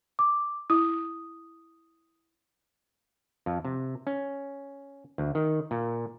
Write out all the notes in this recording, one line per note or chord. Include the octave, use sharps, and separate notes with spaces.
D6
E4 D#6
F2
C3
C#4
D2
D#3
A#2